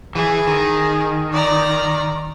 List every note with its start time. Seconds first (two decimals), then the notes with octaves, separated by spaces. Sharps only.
0.15 E3 G#4
0.47 D#3
1.33 D5 A#5